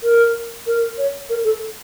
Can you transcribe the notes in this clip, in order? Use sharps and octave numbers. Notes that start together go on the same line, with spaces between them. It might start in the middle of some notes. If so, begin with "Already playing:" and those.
A#4
A#4
C#5
A#4
A4